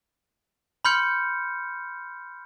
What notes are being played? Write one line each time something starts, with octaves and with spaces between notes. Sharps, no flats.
B5 C6 F6 G6 C#7